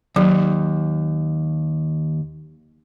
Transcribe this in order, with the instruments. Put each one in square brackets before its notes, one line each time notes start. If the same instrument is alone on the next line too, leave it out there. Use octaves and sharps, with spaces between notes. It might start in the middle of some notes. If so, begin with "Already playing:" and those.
[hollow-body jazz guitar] D#2 [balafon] F#3